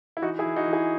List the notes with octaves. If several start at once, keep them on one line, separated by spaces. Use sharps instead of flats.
E4
E3 D#4 F#4
E4 G#4
E3
D#4 F#4
E3
E4 G#4